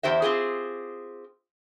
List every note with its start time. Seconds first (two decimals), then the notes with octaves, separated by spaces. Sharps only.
0.03 E2 G4 C5 E5
0.22 C4 F4 G4 G#4